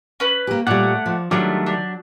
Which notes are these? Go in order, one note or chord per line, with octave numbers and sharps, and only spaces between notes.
C#4 B4
A#3 G4
A#2 G3 A3 C#5 D5 F#5
F3
D#3 F#3 G3 A3 D4 F4 G4
D4 G4